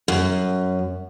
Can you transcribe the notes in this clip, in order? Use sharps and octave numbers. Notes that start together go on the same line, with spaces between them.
F#2